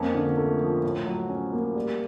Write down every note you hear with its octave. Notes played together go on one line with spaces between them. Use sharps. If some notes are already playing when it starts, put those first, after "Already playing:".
Already playing: F2 A#3 C#4
D3
A3
F3
A2
F#3
C#4
A#3
G3